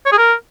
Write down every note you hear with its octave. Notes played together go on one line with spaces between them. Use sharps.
C#5
G#4
A#4